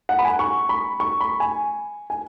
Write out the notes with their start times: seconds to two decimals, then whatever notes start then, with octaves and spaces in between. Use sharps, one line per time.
0.09 F#5
0.19 B5
0.25 G#5
0.39 C#6
0.69 B5
1.00 C#6
1.21 B5
1.40 G#5
2.10 G#5